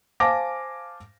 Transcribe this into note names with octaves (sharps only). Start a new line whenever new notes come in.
C5 F5 G#5 A5 D6 A#6